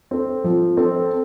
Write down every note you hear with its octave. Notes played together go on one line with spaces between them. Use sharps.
C4 A4
F3
C4 A4